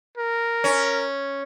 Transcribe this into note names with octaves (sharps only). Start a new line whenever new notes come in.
A#4
C#4